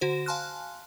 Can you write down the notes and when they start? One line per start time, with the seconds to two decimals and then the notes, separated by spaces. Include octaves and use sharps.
0.01 D3 F#4 C5
0.26 F5 G#5 A5 C6 F6 F#6